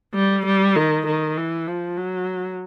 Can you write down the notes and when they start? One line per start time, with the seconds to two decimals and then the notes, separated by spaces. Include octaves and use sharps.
0.15 G3
0.46 G3
0.76 D#3
1.07 D#3
1.38 E3
1.67 F3
1.97 F#3